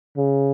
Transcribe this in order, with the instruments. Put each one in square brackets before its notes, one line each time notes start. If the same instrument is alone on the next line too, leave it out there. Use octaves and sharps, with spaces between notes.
[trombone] C#3